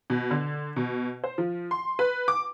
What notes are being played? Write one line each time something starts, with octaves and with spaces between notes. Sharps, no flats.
B2
D3
B2
C5
F3
C6
B4
D6